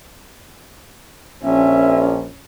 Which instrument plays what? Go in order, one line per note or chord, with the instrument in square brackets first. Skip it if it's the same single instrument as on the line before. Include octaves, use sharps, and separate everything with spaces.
[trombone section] A#1 [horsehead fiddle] C#4 [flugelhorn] E5